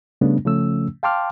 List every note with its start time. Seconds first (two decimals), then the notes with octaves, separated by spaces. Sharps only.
0.21 C#3 G3 A3 B3 D4
0.45 C#3 F3 A3 C#4 E6
1.03 F5 G5 A5 C6 D6 F6